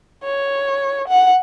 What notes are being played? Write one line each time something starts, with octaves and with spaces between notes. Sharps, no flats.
C#5
F#5